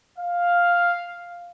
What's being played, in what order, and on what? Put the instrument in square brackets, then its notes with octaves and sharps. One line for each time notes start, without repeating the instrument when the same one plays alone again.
[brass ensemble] F5